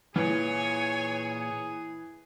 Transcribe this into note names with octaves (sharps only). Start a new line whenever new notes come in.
A#2 E3 G#4 C#5 G#5